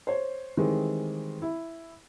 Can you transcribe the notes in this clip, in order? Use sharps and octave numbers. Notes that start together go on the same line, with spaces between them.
C5 C#5
D#3 E3 G3 G#3 C4
E4